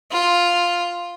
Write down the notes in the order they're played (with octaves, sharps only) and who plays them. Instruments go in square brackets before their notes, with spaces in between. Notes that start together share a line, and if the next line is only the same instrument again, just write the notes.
[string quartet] F4